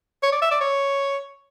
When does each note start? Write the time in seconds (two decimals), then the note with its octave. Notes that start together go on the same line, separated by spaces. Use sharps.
0.23 C#5
0.32 D5
0.42 E5
0.51 D5
0.61 C#5